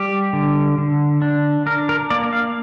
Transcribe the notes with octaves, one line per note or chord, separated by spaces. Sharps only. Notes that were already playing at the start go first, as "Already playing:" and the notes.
Already playing: G3 G4
D3
D3
D4
D4 A#4
A#4
A#3 D5
F5